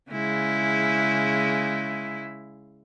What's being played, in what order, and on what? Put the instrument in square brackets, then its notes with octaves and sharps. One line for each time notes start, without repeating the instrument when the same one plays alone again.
[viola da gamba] C#3 G#3 E4